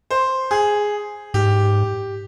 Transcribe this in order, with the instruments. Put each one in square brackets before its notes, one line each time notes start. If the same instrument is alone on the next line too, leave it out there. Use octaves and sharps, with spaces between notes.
[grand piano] C5
G#4
[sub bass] G#2 [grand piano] G4